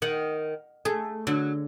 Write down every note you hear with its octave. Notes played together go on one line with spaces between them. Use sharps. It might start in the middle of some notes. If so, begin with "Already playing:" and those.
D#3 F#5
A3 G#4
D3 F#3